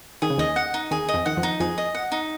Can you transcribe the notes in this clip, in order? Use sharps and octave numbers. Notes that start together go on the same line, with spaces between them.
D#3 G#4
C#3
D#2 D#3 D#5
F#5
D#4
D#2 D#3 G#4
D#5
F2 F3
D#3 F#5
F2 F3
D#4
F2 F3 G#4
D#5
F#5
D#4